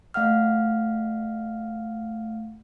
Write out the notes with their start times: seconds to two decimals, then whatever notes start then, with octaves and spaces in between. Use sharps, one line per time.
0.14 A3 F5 F#5 F6